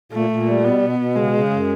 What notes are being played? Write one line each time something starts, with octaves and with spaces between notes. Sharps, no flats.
A#2 A3
A#2
G3
B2 B3
B2
B2
C#3 G#3
C#3
F#2